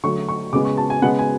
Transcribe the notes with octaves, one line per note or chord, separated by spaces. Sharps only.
D3 F#3 A3 C#6
C#6
C#3 G#3 B3 D6
C#6
A5
G#5
C#3 G#3 B3 F#5
G#5